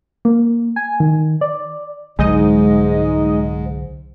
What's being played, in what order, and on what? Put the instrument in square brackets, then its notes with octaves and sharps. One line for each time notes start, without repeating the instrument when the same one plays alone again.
[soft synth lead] A#3
G#5
D#3
D5
[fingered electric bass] C2 D3 F#3 [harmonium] G#2 [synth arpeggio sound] G#3 D#4 D#5